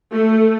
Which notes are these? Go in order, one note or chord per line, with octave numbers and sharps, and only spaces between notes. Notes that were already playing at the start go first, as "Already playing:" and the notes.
A3